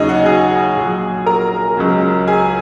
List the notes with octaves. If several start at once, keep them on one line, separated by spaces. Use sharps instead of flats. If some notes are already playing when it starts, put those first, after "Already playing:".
Already playing: D#2 C#3 F#3 D#4 G#4 D#5
F#4 F#5
G#4 G#5
A#1 A#2 F#3
A#4 A#5
C#2 C#3 F#3
G#4 G#5